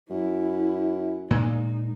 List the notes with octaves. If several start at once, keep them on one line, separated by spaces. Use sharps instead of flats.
F#2 E4
A#2 G#3 D#4